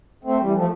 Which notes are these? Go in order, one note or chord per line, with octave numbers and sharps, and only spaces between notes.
A3 C4
E3 G3
F3 A3